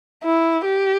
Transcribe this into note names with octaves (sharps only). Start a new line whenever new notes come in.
E4
G4